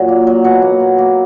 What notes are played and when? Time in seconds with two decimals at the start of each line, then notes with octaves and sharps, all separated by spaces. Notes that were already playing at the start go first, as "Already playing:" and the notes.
Already playing: A#2 F#3
0.08 A#3
0.27 F#3
0.44 B2 F#5
0.62 A#3
0.80 B2
0.98 A#3